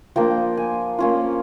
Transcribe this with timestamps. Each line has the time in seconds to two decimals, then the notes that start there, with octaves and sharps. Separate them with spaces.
0.16 F3 A#3 D4 G5
0.57 G#5
0.99 A#3 C#4 F4